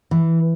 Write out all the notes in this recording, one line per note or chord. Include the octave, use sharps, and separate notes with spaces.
E3